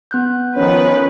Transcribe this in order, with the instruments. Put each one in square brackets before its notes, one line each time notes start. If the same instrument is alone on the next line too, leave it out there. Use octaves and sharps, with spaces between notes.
[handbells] B3 F#6 G6
[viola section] D#3 F3 B4 [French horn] C#4